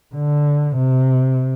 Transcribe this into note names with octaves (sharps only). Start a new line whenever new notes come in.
D3
C3